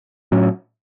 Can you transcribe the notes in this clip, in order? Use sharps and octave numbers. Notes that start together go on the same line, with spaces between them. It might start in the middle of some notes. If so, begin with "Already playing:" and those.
A2 F#3 C#4